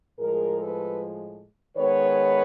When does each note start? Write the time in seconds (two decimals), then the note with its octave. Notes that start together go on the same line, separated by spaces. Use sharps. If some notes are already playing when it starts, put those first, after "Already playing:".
0.19 A2 F3 G#3 G#4 A#4
0.59 A4 B4
1.77 D#3 G#3 B3 B4 C#5